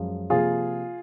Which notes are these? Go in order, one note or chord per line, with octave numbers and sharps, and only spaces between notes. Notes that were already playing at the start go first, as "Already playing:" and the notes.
Already playing: F#2 F3 G#3
C3 F3 A#3 F4 G#4